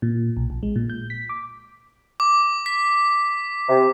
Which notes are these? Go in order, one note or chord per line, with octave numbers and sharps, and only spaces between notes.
A#2
B1
A#1
G#3
A#2
G6
B6
D6
D6
B6
C3